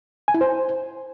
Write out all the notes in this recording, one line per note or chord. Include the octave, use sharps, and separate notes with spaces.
G#5
E4
C5